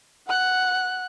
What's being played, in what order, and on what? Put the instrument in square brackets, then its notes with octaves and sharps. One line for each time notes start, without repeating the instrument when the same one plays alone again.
[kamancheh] F#5 F#6